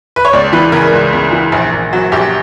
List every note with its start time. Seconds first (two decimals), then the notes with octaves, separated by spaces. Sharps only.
0.16 B4
0.25 C#5
0.33 C#2 D5
0.53 E3 B4
0.72 C#3 A#4
0.93 C#2
1.13 C#2
1.32 E3
1.52 A#1
1.73 A#1
1.93 F#3
2.12 A#1 G4